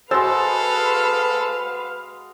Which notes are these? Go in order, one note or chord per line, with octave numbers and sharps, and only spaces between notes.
G#3 F#4 A4 B4 C5 F5 E6 A6